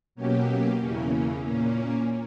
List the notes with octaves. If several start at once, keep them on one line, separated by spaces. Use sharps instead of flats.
B2 F#3 A#3 C#4 G4
E2 C#3 E3 A#3 C#4
A#2 A#3 C#4